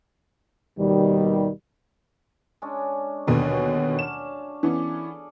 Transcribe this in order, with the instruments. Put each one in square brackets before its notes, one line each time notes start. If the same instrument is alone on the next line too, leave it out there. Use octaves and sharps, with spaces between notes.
[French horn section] D#2 B2 D#3 G3
[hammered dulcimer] G#3 C#4 D4
[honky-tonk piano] D#2 B2 D3 [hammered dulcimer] F#3 C#4 G#5
[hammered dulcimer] C#4 D4 F5 [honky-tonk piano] E7
[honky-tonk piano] E3 B3 C#4 [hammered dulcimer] G#4 A4 D5